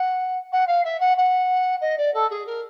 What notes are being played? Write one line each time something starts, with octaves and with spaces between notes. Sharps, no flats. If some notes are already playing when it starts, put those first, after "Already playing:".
Already playing: F#5
F#5
F5
E5
F#5
F#5
D#5
D5
A4
G#4
A#4